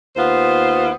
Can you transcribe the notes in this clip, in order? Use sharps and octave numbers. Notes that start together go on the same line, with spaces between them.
D#2 B3 F4 C5